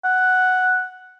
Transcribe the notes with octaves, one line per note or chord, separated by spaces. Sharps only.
F#5